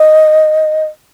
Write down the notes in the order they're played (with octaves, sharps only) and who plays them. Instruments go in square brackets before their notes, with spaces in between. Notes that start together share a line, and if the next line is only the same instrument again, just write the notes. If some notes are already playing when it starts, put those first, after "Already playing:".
Already playing: [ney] D#5